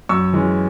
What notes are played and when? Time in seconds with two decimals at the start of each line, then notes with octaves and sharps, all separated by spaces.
0.09 F#2 C#6 E6
0.33 E3 G#3 C#4